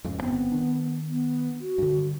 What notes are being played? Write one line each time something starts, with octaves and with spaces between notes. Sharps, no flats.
F2 G#2 C#3
G1 B3 C4
D#3 D4
B3
F#4
G2 D3